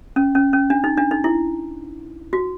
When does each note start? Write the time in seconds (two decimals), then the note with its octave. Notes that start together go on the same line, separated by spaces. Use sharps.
0.16 C#4
0.35 C#4
0.53 C#4
0.70 D4
0.84 D#4
0.97 D4
1.11 D#4
1.24 E4
2.33 F#4